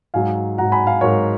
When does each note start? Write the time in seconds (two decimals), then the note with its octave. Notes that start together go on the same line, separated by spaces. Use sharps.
0.14 G#2 F#3 F5 G#5
0.58 G#2 F#3 F#5 A#5
0.72 G#5 B5
0.86 F5 G#5
1.01 G#2 F#3 A#4 C#5